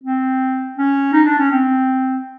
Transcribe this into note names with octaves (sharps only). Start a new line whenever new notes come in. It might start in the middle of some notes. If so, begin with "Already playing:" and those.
C4
C#4
D#4
D4
C#4
C4